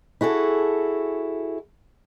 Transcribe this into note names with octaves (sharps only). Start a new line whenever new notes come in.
E4 F#4 G#4 A4